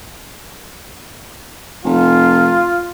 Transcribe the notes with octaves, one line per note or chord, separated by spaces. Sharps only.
F1 F4